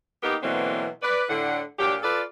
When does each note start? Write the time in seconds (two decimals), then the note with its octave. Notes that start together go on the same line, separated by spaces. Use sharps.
0.23 A#3 B3 D#4 G4
0.42 B2 D3 E3 F#3 A#3 C4
1.02 B4 D5
1.29 A2 D3 F#5
1.79 A#2 F#3 D4 G4
2.03 F4 A4 B4 D5